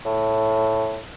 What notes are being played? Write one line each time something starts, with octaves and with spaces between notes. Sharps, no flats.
A2